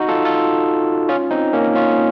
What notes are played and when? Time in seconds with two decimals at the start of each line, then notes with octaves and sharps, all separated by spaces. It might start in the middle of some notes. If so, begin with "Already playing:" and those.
Already playing: D#4 F#4
0.08 F4 A4
0.25 F4 A4
1.09 C#4 F4
1.31 C4 D#4
1.53 A#3 C#4
1.76 C#4 F4